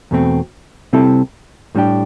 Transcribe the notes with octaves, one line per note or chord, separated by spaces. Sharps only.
E2 B2 A3 C4
C3 G3 C4 E4 A4
A2 G3 D4 G4